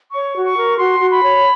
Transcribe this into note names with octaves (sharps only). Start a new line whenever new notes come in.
C#5 C#6
F#4
C#6
A#4
F#4 C6
F#4
B5
C#5